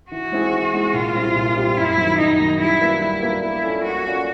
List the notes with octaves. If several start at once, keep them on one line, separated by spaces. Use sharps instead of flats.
E3 F#4
G#3 C4 E4 G#4
E3
G#3 C4 E4 G#4
A#2 F4
G3 C4 E4 G4
A#2
G3 C4 E4 G4
F#2 E4
D#3 F#3
F#2 D#4
D#3 F#3
G3 E4
A#3 D4 F#4 B4
G3 E4
A#3 D4 F#4 B4
A#3 E4
C#4 F4 A4 D5
A#3 F#4
C#4 F4 A4 D5